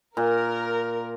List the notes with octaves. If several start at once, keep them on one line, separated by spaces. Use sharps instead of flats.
A#2 A#4